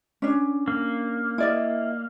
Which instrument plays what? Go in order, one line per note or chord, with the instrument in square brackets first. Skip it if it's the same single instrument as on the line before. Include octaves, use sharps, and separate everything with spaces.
[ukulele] C#4 D4
[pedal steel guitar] A#3
[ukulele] E4 D5 D#5